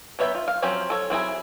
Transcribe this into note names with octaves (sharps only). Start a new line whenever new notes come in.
F#3 B3 C#5 E5 G5
F4
F5
F3 F#3 C4 C#4 G4
A4 C#5
F#3 C4 E4 G#4